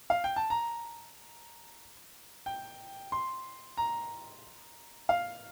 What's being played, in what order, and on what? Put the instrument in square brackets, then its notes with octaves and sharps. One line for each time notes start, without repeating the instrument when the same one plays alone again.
[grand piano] F5
G5
A5
A#5
G5
C6
A#5
F5